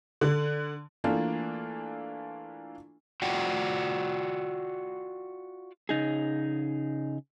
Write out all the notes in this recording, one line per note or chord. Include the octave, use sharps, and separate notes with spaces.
D3
E3 A3 A#3 D4 F4
F4 F#4 D5 F#5 G5
C#3 D#4 G#4